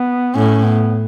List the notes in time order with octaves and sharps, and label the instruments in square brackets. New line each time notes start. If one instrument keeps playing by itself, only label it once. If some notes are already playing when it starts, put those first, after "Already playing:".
Already playing: [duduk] B3
[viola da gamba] A2 [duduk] C#4
[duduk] B3